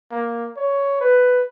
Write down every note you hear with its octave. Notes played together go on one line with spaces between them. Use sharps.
A#3
C#5
B4